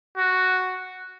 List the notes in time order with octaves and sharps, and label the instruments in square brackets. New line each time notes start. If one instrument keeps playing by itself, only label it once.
[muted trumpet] F#4